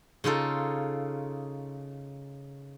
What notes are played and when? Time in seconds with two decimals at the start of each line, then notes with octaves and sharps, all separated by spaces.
0.24 C#3 D#4 F4 A4